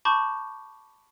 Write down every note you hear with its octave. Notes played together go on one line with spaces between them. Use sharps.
A5 B5 C#6 D6 G6